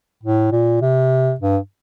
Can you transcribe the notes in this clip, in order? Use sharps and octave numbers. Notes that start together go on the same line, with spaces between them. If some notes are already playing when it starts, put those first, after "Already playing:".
A2
A#2
C3
G2